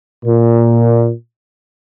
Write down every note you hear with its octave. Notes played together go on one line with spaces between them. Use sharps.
A#2